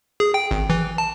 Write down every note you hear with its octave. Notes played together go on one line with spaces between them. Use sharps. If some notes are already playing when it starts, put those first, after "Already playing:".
G#4
G5
G#1
E3
A5